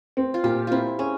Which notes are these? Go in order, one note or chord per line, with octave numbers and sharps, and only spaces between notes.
C4
F4
A#2 G4
C4 E4 F4
C#4 G#4